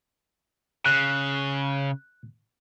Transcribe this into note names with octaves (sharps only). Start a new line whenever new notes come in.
C#3 F#6